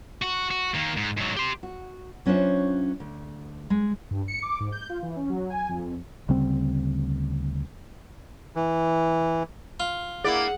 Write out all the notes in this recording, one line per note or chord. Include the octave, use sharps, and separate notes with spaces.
F#4
F#4
D#3 A#3
G#2
G#2 F#3
G4 C6
F#4
F#3 C#4 D4 F4 C5 E5
D2
G#3
G2
C#7
D6
G#2
G6
F4
E3
C#4
F#3
G#5
F2
D2 C#3 G3 C4
E3
F4
A#3 E4 G#4 D5 F#5